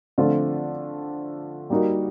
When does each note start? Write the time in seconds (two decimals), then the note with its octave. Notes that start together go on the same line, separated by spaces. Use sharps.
0.18 D3 F3 A3 C4 F4
1.70 G3 A#3 D#4 F#4 A#4